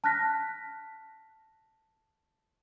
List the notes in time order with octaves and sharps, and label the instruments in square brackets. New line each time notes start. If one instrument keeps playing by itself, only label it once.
[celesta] A5 F6 F#6 A#6 B6